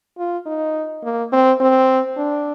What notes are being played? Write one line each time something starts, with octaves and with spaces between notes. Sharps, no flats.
F4
D#4
A#3
C4
C4
D4